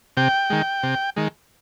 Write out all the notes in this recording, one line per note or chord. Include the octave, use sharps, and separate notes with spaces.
C3 G5
D#3 G#3
C3
D#3 G#3